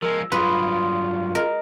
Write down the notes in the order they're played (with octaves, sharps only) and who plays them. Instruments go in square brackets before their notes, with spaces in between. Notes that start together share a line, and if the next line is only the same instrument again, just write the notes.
[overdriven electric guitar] F3 G#3 [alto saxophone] A#4 [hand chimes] E6
[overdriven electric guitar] G2 F#3 [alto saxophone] F4 [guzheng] B4 [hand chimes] C6 D#6
[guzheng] A#4 [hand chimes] D#5